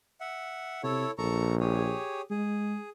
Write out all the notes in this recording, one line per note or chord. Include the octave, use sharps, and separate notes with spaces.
E5 F#5
C3 E4 A4 C#5
A#1 A4 A#5 C#6
G4 G#4 C#5
G#3 G#4